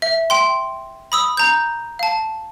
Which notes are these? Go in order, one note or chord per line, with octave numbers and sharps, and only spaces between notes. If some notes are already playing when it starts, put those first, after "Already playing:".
E5
G5 C6
B5 D#6 E6
A#5 G6
F5 A5